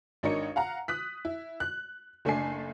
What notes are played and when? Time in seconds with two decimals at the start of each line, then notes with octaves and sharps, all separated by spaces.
0.23 G#1 D4 D#4 A#4 C#5 C#7
0.56 F5 F#5 A#5
0.88 D#6 F#6 B6
1.25 E4
1.60 F#6
2.25 F#1 A3 D4 A4 G#5 C7